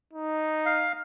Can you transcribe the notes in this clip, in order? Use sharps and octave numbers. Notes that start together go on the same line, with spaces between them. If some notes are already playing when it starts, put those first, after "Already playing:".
D#4
F5